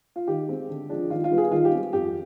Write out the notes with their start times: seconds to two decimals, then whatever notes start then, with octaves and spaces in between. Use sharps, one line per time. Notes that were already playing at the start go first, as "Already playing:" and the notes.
0.16 F4
0.27 D#3 G4
0.48 G#3 C4
0.69 D3
0.89 F3 G#3 D4
1.10 D#3 F4
1.24 F4
1.31 G3 B3
1.38 G#4
1.51 D#3 F4
1.65 G4
1.72 G3 C4
1.93 F2 G4